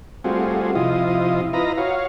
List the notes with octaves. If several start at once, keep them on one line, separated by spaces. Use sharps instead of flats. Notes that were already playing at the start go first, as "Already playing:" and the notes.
G3 A3 C4 F4 F#4 G#4
C3 F3 E4 F4 D#5
E4 F4 B4 D#5 A#5
F#4 C#5 F5